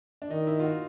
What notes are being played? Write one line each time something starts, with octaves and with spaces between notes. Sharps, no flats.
D4
D#3 D#4
E4
F4
F#4